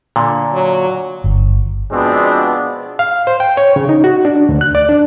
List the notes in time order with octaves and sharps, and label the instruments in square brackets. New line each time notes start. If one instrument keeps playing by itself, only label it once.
[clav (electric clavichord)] A#2 D3
[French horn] F#3
[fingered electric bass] G1
[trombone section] B2 F3 G#3 B3 C4 D4
[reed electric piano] F5
C5
G5
C#5
C#3
D#4
F#4
D4
D2
F#6
D5
D4